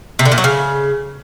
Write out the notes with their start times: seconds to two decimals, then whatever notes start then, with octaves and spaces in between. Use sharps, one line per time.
0.19 C3
0.25 D3
0.32 A#2
0.38 F#3
0.44 C#3